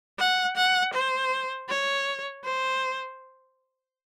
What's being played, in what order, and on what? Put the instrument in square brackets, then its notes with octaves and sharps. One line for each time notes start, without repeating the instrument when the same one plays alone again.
[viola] F#5
F#5
C5
C#5
C5